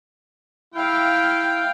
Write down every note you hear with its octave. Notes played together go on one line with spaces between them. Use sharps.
E4 F5 G5